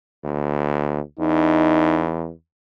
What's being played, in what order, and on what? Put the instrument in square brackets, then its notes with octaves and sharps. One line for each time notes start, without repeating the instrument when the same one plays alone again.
[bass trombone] D2
[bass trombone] E2 [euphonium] D#4